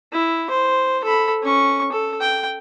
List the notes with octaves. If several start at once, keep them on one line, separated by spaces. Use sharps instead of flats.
E4
C5
A4 B5
C#4 C#6
A4
G5